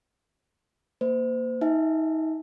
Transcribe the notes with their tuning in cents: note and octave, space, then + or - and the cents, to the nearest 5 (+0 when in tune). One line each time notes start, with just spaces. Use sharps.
A#3 +0 C5 -35
D#4 +30 E5 +0 G#5 +0